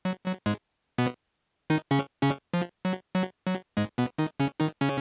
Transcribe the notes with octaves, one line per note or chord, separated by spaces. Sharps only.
F#3
F#3
G#2 G#3
B2 B3
D#3 D#4
C#3 C#4
C#3 C#4
F3
F#3
F#3
F#3
G#2 G#3
B2 B3
D#3 D#4
C#3 C#4
D#3 D#4
C#3 C#4